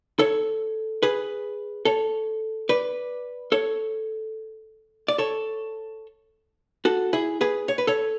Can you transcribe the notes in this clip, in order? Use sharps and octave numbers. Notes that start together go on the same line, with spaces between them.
A4 C#5
G#4 B4
A4 C#5
B4 D5
A4 C#5
D5
A4 C#5
F#4 A4
E4 G#4
G#4 B4
C#5
B4
A4 C#5